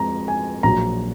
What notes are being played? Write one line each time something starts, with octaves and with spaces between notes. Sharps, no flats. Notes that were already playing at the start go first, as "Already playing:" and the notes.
Already playing: F2 F3 G#3 A#5
G#5
A#1 A#2 F#3 A#5